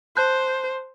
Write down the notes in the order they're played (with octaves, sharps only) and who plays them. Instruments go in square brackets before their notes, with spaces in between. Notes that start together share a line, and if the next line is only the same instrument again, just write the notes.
[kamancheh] C5 [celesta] A5 F#6 G6